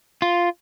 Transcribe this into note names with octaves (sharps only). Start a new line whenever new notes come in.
F4